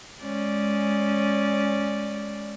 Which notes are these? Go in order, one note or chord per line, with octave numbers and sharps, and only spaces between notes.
G#3 C#4 D5